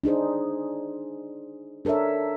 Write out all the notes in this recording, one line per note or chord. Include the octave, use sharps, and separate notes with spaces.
D4 D#4 G#4 C5
D4 A4 A#4 C#5 E5